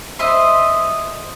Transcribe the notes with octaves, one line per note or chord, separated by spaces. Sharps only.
C5 D#5 E5 C6